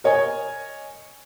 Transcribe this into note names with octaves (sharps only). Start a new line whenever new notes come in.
A#4 C#5 D#5 G#5